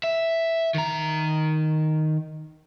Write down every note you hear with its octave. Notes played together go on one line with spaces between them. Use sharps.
E5
D#3 A#5